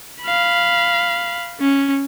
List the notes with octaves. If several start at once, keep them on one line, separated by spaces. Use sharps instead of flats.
F5 B5
C#4